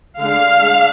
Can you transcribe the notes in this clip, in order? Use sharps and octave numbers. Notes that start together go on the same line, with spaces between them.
D3 G#3 D4 F5
G#3 D4